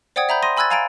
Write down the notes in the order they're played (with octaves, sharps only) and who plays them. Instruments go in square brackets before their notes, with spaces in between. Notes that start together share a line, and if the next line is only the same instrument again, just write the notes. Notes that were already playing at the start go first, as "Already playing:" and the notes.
[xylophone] C5 D5 F#5 G5 D#6 G#6
E5 A#5 B5 G6
C6 D#6 A#6 D#7
G#5 B5 E6 F#6 G#6 A6
F5 G#5 A#5 G#6 A6 D7